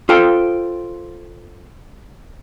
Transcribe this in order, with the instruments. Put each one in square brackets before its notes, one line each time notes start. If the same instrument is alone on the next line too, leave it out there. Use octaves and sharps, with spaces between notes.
[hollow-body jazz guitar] F4 A4 C5 G5